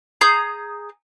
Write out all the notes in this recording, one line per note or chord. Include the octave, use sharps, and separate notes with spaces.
G#4 A#5 D#6 G6